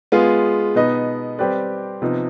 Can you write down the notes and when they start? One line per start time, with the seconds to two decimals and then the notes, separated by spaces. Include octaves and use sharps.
0.12 G#3 B3 F4 G#4
0.75 B2 B3 D#4 B4 D#5
1.39 G3 C4 G4 B4 D5
2.02 C3 F3 B3 D#4